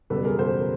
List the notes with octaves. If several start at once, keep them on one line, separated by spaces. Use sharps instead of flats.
F#1 E2 B2 G3 A4 B4
G#4 A#4
A#4 C5